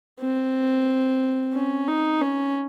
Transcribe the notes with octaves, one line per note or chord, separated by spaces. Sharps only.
C4
C#4
D#4
C#4